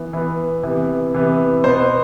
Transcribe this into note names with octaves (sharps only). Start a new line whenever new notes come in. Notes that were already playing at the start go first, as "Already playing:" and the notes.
Already playing: E3 B3
E3 B3
C3 E3 B3
C3 E3 B3
B2 B3 C5